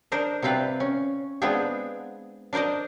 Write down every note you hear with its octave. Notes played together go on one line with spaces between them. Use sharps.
D4 A#4 C5 D#5
C3 G3 C4 F4 B4
C#4
G#3 B3 C4 D4 F4 G#4
D4 A#4 C5 D5 D#5